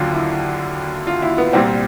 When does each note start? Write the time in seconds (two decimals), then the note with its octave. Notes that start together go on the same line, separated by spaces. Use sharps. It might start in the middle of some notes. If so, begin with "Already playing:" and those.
Already playing: D#2 D3 F#3 F4
0.12 E4
1.07 F4
1.22 E4
1.38 B3
1.53 C2 A#2 G3 C4